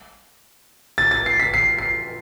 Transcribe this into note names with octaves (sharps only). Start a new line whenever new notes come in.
A6
A6
C7
B6
C7
C7